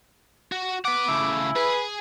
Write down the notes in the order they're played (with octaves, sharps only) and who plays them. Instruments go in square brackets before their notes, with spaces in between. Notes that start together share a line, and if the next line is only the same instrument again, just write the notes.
[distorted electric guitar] F#4
[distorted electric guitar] B4 F#5 [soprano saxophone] D6
[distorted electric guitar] C#3 A3 [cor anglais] E4
[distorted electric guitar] G#4 G#5 [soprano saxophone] B4